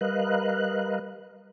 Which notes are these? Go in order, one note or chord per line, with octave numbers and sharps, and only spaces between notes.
G3 A#4 B4 D#5 F5 F#6